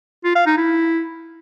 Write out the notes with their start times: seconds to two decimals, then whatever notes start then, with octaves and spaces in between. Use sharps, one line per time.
0.25 F4
0.36 F5
0.47 D#4
0.58 E4